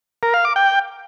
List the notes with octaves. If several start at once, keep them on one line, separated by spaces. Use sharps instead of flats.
A#4
F5
D6
G5